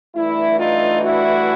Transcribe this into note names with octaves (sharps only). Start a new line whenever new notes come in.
G2 E3 A3 D4 E4
D#4 F4
E4 F#4